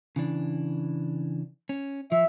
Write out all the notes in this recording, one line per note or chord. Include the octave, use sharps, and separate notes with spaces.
C#3 E3 D4
C#4
F3 E5